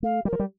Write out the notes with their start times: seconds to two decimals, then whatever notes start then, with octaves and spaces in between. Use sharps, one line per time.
0.03 A3 F5
0.25 G3 A#4
0.33 F3
0.40 G3